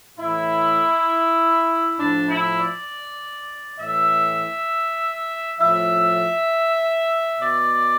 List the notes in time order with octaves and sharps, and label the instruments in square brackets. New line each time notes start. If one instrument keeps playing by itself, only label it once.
[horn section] A2 E3 E4
A2 F3 D4
E4
D5
A2 E3 E5
A2 F3 E5
B2 D5